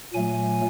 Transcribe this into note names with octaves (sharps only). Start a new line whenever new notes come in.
A#2 F#3 A3 G#5